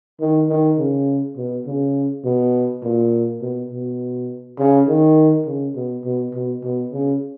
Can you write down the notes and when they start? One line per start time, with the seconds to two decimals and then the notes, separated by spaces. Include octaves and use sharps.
0.20 D#3
0.49 D#3
0.78 C#3
1.37 B2
1.66 C#3
2.25 B2
2.83 A#2
3.41 B2
3.71 B2
4.59 C#3
4.88 D#3
5.46 C#3
5.76 B2
6.05 B2
6.34 B2
6.63 B2
6.93 C#3